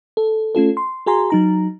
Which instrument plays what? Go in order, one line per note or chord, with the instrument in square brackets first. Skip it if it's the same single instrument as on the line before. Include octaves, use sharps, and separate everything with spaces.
[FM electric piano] A4
A3 C#4 F4 A4
C6
F#4 G#4 G#5 A#5 C6
F#3 D#4 A#5